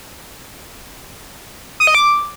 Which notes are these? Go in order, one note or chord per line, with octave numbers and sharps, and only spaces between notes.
D#6
D#5
D6